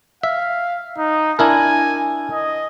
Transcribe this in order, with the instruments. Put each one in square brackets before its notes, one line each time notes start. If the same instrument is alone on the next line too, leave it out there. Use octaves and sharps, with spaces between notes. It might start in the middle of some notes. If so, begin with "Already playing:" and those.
[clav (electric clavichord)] E5 [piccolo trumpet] F5
[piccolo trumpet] D#4
[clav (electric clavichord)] D4 E4 A#4 [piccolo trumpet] G#5
[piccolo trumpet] D#5